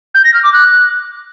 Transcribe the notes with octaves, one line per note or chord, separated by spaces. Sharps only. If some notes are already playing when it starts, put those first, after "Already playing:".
G6
A#6
F6
D6
F#6